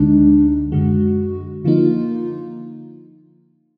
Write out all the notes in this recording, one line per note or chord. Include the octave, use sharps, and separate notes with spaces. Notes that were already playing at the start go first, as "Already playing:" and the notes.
Already playing: D2 D3 G#3 D4 D#4
F#2 D3 G#3 F#4
D3 F3 A#3 D#4 F4